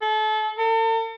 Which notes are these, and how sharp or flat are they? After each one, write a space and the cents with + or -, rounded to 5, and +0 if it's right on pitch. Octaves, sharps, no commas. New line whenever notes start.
A4 -30
A4 +45